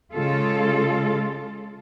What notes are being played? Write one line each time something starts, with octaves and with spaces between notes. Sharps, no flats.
C#3 G#3 F4 A4